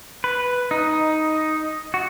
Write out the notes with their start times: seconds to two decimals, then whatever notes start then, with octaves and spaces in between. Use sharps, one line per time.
0.24 B4
0.71 D#4
1.94 F#4